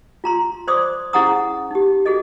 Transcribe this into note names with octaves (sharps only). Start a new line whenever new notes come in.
F4 A#5 C6
C5 D5 C6 D6 D#6
C#4 E4 G#4 F#5 A#5 D#6
D#4 G4
F#4 G#4 A4 D#5